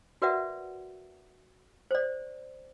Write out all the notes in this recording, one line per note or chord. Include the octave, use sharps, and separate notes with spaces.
F#4 A#4 B4 D5 E5 F#5
C5 D5